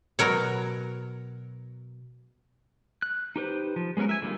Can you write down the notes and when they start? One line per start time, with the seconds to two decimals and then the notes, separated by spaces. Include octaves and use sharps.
0.19 B2 F#3 A#4 C#5
3.02 F#6
3.36 D#4 G4 B4 C5
3.76 F3
3.97 G#3 B3 C#4 F#4 A#4
4.09 E5 G#5
4.22 D3 G3 A#3 D#4 F4